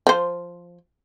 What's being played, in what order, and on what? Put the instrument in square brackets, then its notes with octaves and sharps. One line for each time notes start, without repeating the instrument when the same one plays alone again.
[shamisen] F3 C5